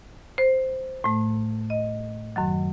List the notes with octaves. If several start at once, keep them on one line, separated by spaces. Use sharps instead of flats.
C5
A2 A3
D#5
F#2 D#3 F#3